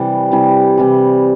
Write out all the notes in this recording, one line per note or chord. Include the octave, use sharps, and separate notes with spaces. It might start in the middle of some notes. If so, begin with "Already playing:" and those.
Already playing: C3 E3 G3
C3 E3 G3
C3 E3 G3